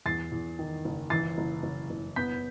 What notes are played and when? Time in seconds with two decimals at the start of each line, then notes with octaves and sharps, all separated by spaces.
0.06 E2 A6 C7
0.32 E2
0.59 D#3
0.85 F#1
1.10 E3 A6 C7
1.38 F#1
1.63 F#1
1.90 F#1
2.16 B3 G6 B6